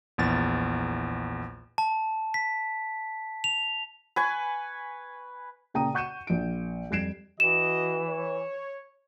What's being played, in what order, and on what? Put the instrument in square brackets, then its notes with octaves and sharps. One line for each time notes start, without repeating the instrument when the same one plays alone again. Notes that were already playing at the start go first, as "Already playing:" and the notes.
[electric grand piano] A#1 E2 A6
[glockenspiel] A5
B6
F7
[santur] B4 G#5 C#6
[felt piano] A#2 C#3 G5 A#5 D#6 D#7
F#5 C#6 G6 C#7 D#7 E7
A#1 D7
F2 G3 G#6 C7 D7 E7
[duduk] E3 [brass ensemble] F#4 D#5 [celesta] E7
[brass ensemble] C#5